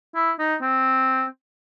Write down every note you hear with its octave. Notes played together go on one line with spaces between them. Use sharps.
E4
D#4
C4